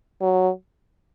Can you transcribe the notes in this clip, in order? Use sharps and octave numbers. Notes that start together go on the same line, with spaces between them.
F#3